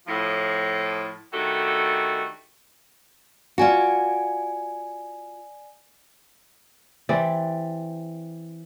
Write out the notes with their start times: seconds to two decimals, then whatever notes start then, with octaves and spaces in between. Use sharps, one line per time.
0.07 A2 F3
1.33 D#3 G3 A3 D4 F#4 A4
3.58 F4 F#4 D5 G#5 C#7
7.09 E3 C4 G4 D5